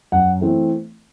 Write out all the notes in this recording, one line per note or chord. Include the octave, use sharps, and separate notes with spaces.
F#2 F#5
E3 A3 C4